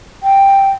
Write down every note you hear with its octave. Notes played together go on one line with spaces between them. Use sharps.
G5